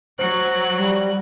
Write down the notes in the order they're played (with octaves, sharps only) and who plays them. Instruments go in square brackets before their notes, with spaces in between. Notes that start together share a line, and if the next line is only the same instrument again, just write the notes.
[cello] F#3 [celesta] C5 [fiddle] F#6
[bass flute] G3